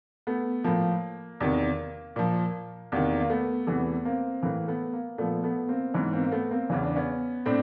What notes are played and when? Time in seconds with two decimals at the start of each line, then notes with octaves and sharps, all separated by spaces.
0.27 A3 B3
0.64 A2 F3 A#3
1.40 E2 C3 D#3
2.16 A#2 F3
2.92 E2 C3 D#3 A#3
3.21 A#3
3.30 A3 B3
3.67 E2 C3 E3 A3 B3
4.05 A#3 C4
4.42 A2 E3 A#3
4.68 A3 B3
4.93 A#3
5.18 A#2 F3 A3 B3
5.44 A3 B3
5.69 A#3 C4
5.94 G#2 E3 B3 C#4
6.13 A#3 C4
6.24 A#3
6.32 A3 B3
6.51 A#3 C4
6.70 E2 C#3 E3 C#4
6.83 D4
6.96 B3 C#4
7.46 A2 C4 D4